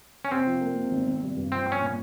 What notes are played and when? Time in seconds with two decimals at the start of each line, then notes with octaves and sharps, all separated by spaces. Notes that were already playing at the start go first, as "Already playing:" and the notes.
0.25 C#4
0.31 C3 C4
0.46 F3
0.61 A#3
0.77 C3
0.91 G#1
1.07 G#1
1.22 G3
1.36 G2
1.52 F3 C4
1.66 F3
1.72 C#4
1.81 A#2